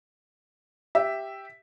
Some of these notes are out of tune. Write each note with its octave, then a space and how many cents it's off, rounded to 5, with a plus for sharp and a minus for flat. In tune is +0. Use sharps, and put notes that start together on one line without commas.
G4 +0 E5 +0